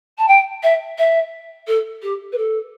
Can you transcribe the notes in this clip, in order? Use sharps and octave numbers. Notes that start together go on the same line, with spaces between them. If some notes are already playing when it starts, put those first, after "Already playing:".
A5
G5
E5
E5
A4
G4
B4
A4